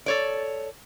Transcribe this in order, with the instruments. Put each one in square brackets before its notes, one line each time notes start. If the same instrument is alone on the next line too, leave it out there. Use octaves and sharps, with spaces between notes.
[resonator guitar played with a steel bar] A4 C#5 D5